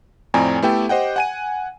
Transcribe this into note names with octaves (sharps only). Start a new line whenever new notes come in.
F2 A2 C4 D5 G#5 A#5
A3 B3 E4 G4 A4 G5
G4 C5 D#5 F#5 G5
F#5 G#5 D#7